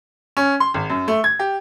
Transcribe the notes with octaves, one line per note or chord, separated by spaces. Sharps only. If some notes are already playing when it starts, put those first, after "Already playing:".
C#4
C6
G#1
F#2
A3
G#6
G4